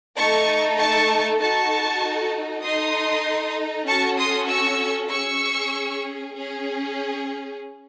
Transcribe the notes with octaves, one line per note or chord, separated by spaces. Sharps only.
A3 D#4 A4 A5 C#6
A5 C#6
D#4 F#4 A4 A5 C#6
D#4 A4 C6 D#6
C#4 F#4 A4 A5 C#6
C6 D#6
C#6 E6
C#4 G#4 C#6 E6
C#4 G#4